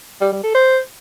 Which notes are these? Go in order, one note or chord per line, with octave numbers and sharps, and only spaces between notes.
G3
G3
A4
C5